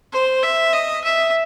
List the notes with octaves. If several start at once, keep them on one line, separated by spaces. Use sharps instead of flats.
C5
E5
D#5
E5